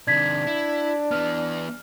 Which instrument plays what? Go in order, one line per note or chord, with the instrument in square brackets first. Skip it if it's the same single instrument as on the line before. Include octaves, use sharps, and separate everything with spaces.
[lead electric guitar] C3 D#3 [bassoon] D4 [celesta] G#6 B6
[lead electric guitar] E4
[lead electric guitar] E3 B3 [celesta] F6